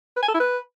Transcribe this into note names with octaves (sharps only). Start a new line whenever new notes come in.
B4
G#5
A4
E4
B4